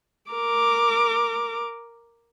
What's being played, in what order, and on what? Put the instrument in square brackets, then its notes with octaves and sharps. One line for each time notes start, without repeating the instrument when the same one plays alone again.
[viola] A#4 D6